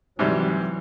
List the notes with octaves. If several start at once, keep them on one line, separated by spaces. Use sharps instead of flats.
G#2 C3 E3 F#3 G3